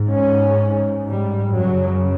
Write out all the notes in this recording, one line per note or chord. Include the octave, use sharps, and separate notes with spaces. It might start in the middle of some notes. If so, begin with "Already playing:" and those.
Already playing: G#2
C#4
G3
F#2 C#3 F#3